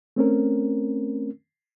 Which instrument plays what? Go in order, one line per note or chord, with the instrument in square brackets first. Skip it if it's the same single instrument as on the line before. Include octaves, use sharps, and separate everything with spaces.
[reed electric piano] A3 C4 C#4 A#4